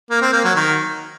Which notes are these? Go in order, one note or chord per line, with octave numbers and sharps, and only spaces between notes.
A#3
C4
A#3
F#3
D#3